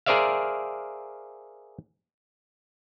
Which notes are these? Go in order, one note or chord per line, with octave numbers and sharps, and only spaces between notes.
G#4 A#4 C5 D5 E5 F5